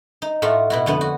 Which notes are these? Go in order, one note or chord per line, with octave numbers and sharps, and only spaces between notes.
D#4
A2 A3 F4 F#4
B2 E4 F#4
F2 D3 B3
F#4